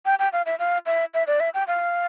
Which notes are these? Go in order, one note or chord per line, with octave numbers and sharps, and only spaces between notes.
G5
G5
F5
E5
F5
E5
E5
D5
E5
G5
F5